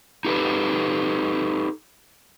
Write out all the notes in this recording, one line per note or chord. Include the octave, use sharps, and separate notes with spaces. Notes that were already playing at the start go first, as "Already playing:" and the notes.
D#4 G4 A4 B4